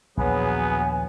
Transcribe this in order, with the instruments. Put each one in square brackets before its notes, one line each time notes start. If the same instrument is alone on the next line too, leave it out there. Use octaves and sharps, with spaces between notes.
[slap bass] A#1 D#2 [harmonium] F#3 G#4 B4 [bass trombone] B3 [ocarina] G#5